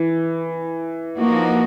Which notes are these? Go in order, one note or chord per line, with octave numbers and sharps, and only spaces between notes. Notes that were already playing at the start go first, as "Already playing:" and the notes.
Already playing: E3
F3 A#3 D#4 F#4